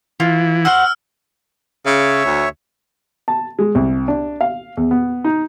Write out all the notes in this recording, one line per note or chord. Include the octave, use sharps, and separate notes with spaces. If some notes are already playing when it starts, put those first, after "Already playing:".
E3 F4
F#4 C5 F#5 E6 F6
C#3 C#5 E5
D2
A5
G#3
C2
D4
F5
E2
B3
D#4